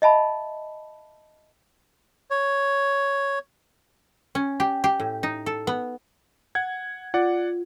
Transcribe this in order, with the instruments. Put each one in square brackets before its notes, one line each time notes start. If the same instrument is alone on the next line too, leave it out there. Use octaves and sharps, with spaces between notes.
[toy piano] D#5 E5 A5 B5
[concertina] C#5
[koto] C#4
G4
G4
A2
D#4
A4
B3
[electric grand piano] F#5 G#6
[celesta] F4 [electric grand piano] D5 F#5